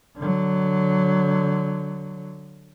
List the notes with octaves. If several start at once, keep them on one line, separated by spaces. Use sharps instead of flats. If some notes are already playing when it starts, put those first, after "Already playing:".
D3 F#3